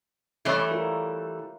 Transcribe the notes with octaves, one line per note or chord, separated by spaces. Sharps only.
E3 G3 A3 C#5 E5
E4 F4 A#4